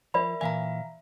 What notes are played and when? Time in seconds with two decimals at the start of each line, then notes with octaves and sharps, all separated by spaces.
0.14 F3 A#4 D5 E5 B5
0.41 A#2 E3 E5 F5 G#5 A#5